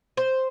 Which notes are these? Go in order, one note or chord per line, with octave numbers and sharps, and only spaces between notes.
C5